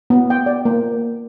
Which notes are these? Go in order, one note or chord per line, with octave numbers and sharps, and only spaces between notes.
B3
G5
D5
A#3